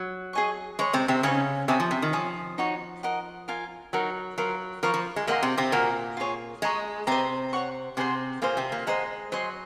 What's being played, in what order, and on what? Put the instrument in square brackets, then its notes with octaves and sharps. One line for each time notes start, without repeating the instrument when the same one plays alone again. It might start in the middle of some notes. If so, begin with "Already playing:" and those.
Already playing: [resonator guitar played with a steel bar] F#3
[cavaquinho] G#4 D#5 G#5 C#6
[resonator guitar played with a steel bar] G#3 [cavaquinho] C#5 G#5 C#6
[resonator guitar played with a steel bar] C3 C4
C3 C4
[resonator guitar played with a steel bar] C#3 C#4 [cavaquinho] D#4 G#4 C5
[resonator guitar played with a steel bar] C3 C4 [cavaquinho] C#5 G#5 D#6
[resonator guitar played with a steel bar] F3
C3
D#3
[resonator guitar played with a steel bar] F3 [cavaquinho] C#5 G#5 D#6
[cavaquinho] D#4 F#4 C#5
A#4 D#5 F#5
F4 A#4 F5 G#5
[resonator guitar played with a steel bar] F#3 [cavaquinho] D#4 F#4 A#4
[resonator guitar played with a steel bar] F#3 [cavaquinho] F4 A#4 F5
[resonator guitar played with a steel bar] F3 [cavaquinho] A#4 F5 A#5 C#6
[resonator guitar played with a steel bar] F3
G#3
[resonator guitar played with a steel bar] A#2 A#3 [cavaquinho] A#4 D#5 F#5 C6
[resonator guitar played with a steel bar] C3 C4
C3 C4
[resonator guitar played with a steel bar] A#2 A#3 [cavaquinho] F#4 A#4 D#5
[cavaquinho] F4 G#4 C#5
[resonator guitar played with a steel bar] G#3 [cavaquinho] G#4 D#5 A#5 C#6
[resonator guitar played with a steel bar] C3 C4 [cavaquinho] C5 D#5 A#5
[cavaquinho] C#5 F#5 C#6
[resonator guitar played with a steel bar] C3 C4 [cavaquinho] G#4 C5 F#5 C6
[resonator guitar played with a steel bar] A#2 A#3 [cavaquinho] F4 G#4 C5
[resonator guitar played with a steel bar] C3 C4
A#2 A#3
[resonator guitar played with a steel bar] G#3 [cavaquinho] C5 D#5 F#5 A#5
[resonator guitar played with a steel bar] F#3 [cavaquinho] C5 D#5 G#5 C6